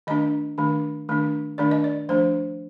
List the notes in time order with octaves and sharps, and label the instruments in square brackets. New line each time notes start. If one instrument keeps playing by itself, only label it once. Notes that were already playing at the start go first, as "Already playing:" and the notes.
[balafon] D#3 A3 D4 D#5
D#3 A3 D4
D#3 A3 D4
D#3 A3 D4 D5
D#5
D5
F3 A3 D4 C5